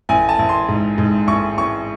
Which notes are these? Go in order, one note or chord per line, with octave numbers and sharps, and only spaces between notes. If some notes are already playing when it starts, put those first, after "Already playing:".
A1 G#5
A5
A1
C6
G#2
G#2
A1 C#6
A1 C#6